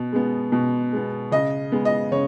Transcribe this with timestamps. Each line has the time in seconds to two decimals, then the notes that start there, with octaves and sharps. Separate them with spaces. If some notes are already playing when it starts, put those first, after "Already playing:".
Already playing: B2
0.13 G#3 B3
0.52 B2
0.93 G#3 B3
1.32 C#3 D#5
1.72 G#3 B3
1.85 D#5
2.11 C#3 C#5